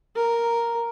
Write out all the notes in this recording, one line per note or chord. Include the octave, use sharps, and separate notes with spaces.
A#4